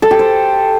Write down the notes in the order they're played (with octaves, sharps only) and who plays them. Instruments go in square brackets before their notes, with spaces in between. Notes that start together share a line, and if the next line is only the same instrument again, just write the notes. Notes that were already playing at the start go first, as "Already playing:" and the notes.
[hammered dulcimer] A4
G4
C5